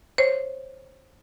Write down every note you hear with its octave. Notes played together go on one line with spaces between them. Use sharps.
C5 C#5